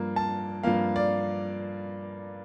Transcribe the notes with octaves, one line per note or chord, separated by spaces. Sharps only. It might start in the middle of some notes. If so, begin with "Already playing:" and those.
Already playing: G2 F3 A#3
A5
G2 F3 A#3 F5
D5